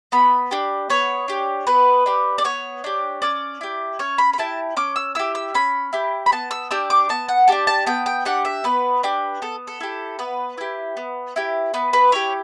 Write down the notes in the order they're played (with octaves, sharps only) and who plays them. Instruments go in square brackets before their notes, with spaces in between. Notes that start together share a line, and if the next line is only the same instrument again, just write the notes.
[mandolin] B3 B5
D4 G4
B3 C#5
D4 G4
B3 B4
D4 G4
D5
B3 C#5
D4 G4
C#4 D5
E4 G4
C#4 C#5
B5
B5
E4 G4 A5
C#4 D6
E6
E4 G4 E6
E6
C#4 B5
E4 G4
B5
B3 A5
E6
D4 G4 E6
D6
B3 A5
F#5
D4 G4 A5
A5
B3 G5
G5
D4 G4 F#5
E5
B3 B4
D4 G4
B3 A4
A4
E4 G4
B3 B4
E4 G4
B3
E4 G4
B3 B4
B4
E4 G4 C#5